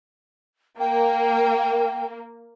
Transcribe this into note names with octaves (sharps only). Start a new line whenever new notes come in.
A#3 G5